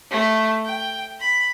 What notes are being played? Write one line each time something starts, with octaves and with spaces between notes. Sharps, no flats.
A3
G5
B5